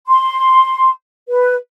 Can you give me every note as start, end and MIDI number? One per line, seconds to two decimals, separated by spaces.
0.08 0.89 84
1.29 1.54 71